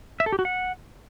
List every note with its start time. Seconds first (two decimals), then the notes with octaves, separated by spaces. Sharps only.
0.20 E5
0.26 A4
0.32 G4
0.39 F#4
0.45 F#5